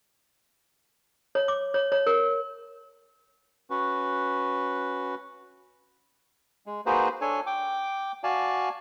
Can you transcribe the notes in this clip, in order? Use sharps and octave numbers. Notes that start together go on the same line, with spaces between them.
C#5
D6
C#5
C#5
A#4
C#4 F#4 B4
G#3
A#3 D#4 F#4 G#4 B4 C5
D4 A4 C#5 G#5
G5 D6
F#4 D5 F5 G#5 A5